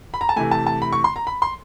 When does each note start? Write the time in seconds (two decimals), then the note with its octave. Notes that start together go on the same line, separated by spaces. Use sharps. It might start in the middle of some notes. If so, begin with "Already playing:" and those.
0.14 B5
0.21 A#5
0.29 A5
0.36 C3 E3 A3 G#5
0.51 A5
0.67 A5
0.82 B5
0.92 C#6
1.04 C6
1.16 A#5
1.27 B5
1.42 C6